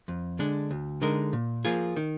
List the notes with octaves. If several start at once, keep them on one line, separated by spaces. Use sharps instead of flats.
F2
D3 G#3 D4
D2
D3 G#3 D#4 A#4
A#2
F3 A#3 F4 G#4
D#3